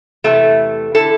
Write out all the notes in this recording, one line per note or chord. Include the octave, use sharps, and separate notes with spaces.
E2 C3 E3 A3
D3 E4 A4